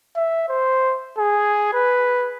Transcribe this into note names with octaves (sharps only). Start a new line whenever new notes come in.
E5
C5
G#4
B4